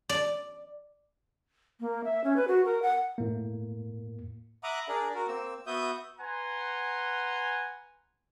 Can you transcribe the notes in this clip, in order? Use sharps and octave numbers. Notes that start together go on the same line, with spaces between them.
D5
A#3
E5
C#4
B4
F#4
A#4
F#5
A2 A#3
E5 F#5 A#5 B5 D6 D#6
D4 G#4 A#4 D5
F#4 A#4
A#3 C4 E6
B3 F#4 E5 D#6 G6
B4 F#5 G#5 A#5 C6